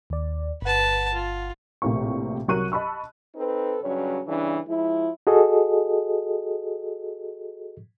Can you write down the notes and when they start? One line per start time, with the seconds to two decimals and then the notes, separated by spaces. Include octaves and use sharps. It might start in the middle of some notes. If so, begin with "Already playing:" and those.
0.10 D#2 D5
0.62 G1 B4 F#5 A5
1.13 F4
1.82 A#1 A2 C3 A#3 C#6
2.48 C2 F#3 A#4 C#6 F#6 D#7
2.72 D#5 A5 B5 C#6 E6
3.36 C4 D#4 A4 B4
3.82 G2 C#3 F#3 C#4 C#5
4.27 G2 C#3 E3 D4
4.67 F3 G#3 E4
5.27 F#4 G#4 A4 D#5